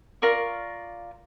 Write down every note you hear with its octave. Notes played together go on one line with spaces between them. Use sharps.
F4 A#4 D5 C#6